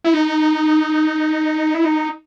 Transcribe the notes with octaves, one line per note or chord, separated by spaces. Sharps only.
E4
D#4
E4
D#4